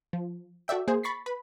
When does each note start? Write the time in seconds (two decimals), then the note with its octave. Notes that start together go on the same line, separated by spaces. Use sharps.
0.13 F3
0.68 F#4 A4 D5 E5 G5
0.88 A#3 G#4 C5
1.03 B5 C#6 A6 B6 C7
1.26 B4 B5